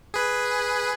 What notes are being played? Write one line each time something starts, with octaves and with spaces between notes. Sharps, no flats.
G#4 B4